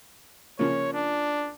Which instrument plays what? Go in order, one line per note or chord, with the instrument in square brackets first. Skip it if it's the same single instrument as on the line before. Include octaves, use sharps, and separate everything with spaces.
[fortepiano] C#3 F3 A#3 [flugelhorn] C#5
[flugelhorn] D4